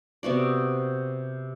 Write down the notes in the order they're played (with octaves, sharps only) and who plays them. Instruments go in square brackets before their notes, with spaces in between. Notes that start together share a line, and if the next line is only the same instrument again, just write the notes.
[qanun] C3 B3 F#4 D5